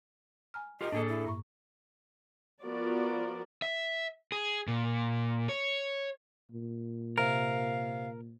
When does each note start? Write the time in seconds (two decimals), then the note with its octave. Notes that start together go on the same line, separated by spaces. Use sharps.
0.54 G#5 A#5 F6
0.81 F4 G4 A#4 D#5
0.92 A2 A#3 D4 G#4 A4
1.09 E4
1.25 G2 A#5 C#6
2.63 F3 B3 F4 F#4 A#4 D5
3.62 E5
4.32 G#4
4.67 A#2
5.49 C#5
6.51 A#2
7.18 C3 A#4 F5